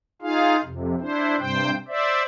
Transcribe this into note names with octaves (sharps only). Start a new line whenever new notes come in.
D#4 F4 G#4 F5
F2 C3
D4 E4 C5
G2 C3 C5 G5
C5 D5 E5